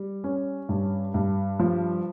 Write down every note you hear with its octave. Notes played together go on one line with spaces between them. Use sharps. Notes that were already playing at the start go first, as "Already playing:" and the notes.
Already playing: G3
C#4
G2
G2
F3